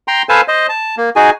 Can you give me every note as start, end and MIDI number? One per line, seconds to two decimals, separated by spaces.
0.08 0.22 79
0.08 0.22 82
0.08 0.22 84
0.29 0.41 69
0.29 0.41 71
0.29 0.41 72
0.29 0.41 77
0.29 0.41 80
0.29 0.41 81
0.48 0.67 72
0.48 0.67 75
0.69 0.95 81
0.97 1.10 58
1.16 1.30 63
1.16 1.30 66
1.16 1.30 68
1.16 1.30 80